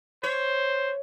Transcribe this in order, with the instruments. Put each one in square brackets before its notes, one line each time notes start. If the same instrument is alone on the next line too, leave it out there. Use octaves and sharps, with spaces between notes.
[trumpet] C5 [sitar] C#5